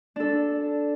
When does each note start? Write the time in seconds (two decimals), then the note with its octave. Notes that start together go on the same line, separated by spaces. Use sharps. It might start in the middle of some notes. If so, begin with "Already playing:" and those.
0.16 D4 A4